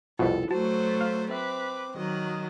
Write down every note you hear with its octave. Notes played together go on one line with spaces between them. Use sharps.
C2 F2 B2 E4 F4 A4
F#3 A3 F#4 C5 A5
F5
C4 B4 E5 D6
D#3 F#3 D#5